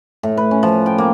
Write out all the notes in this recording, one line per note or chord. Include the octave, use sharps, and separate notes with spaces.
A2
B4
C#4
F3
G5
A#3